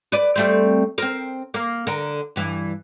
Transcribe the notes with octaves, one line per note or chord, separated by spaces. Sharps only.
B4 D5
G3 A3 C4
C4 A#4
A#3
D3 A#4
G2 E3